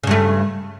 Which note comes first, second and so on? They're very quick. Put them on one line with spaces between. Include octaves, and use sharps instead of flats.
C#3 G2 A3